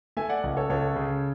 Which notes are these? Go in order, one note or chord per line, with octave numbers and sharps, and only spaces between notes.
A3 E5 G#5
D5 F#5
C#2
A4 C#5
C#2 A4 C#5
C#3